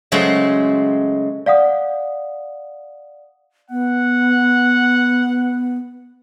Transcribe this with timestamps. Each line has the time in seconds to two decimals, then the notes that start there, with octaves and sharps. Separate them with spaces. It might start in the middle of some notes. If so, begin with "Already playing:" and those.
0.12 C#3 F#3 G#3 A3 C5
1.46 D5 F5 F#5 D#6
3.70 B3 F#5